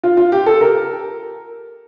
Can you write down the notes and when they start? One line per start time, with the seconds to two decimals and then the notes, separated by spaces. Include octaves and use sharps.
0.03 F4
0.17 F4
0.32 G4
0.46 A4
0.61 A#4